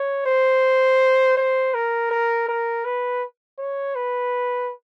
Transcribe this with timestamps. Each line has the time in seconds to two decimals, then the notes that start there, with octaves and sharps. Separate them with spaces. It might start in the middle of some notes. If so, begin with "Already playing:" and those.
Already playing: C#5
0.26 C5
1.37 C5
1.74 A#4
2.11 A#4
2.48 A#4
2.85 B4
3.59 C#5
3.95 B4